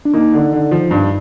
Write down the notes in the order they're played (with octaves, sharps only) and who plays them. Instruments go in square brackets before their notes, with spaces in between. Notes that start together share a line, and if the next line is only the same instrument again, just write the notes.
[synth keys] D4
[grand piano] A#3 [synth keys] D#4
[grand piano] D3
D3
F3
G2